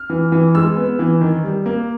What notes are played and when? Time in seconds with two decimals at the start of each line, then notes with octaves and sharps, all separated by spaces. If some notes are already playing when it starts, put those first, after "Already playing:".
Already playing: F6
0.10 E3
0.32 E3
0.55 G#3 E6
0.76 B3
0.99 E3
1.21 D#3
1.44 G3
1.66 A#3